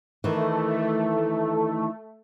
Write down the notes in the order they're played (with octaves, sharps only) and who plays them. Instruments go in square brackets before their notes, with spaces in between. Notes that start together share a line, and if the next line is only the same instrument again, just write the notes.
[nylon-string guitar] D#3 E3 [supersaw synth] A3